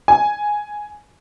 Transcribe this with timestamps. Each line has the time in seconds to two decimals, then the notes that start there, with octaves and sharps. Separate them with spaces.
0.08 G#5